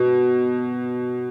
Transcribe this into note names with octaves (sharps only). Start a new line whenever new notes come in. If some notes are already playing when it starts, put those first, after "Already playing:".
Already playing: B2